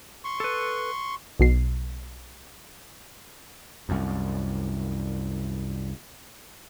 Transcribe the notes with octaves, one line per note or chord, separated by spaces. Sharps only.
C6 C#6
A4 B4
B1 B2 C7
C2 F#2